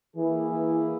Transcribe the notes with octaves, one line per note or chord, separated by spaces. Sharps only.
E3 A#3 E4 G#4
E3